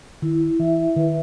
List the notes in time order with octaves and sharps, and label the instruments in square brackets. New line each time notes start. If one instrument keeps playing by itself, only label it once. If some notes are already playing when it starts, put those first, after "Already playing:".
[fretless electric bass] D#3 [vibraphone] E4
[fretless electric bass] E3 [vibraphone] E5
[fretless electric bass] D#3 [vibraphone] B4